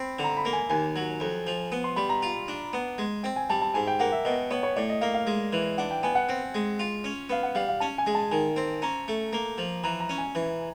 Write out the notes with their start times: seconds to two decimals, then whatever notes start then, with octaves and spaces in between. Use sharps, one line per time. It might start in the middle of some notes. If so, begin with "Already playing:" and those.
Already playing: C4 B5
0.19 D3
0.24 A#5
0.37 B5
0.45 A#3
0.53 G#5
0.70 D#2 G#5
0.96 F#3
1.20 F2
1.47 F3
1.72 B3
1.84 C6
1.96 G3 B5
2.09 A#5
2.23 F4
2.48 D4
2.73 B3
2.98 G#3
3.23 C4 G5
3.36 G#5
3.50 G3 A5
3.62 A5
3.74 G#2 G#5
3.87 G5
4.00 A#3 F#5
4.12 E5
4.25 B2 D#5
4.51 B3 C#5
4.63 C#5
4.76 A2 D5
4.89 D#5
5.01 A#3 F5
5.14 F5
5.27 G#3
5.53 E3
5.78 D4 F#5
5.91 G5
6.03 B3 G#5
6.15 F#5
6.29 C4
6.54 G#3
6.80 F4
7.04 C#4
7.29 B3 F5
7.43 F#5
7.55 G3 F5
7.69 F5
7.80 C#4 A5
7.98 G#5
8.07 G#3
8.15 A5
8.31 D#3 G#5
8.56 C4
8.82 C#4 A#5
9.08 A3
9.33 A#3
9.58 F3
9.84 E3 A#5
10.00 A#5
10.09 C#4
10.18 G#5
10.35 E3